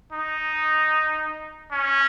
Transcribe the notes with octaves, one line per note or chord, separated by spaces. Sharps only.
D#4
C#4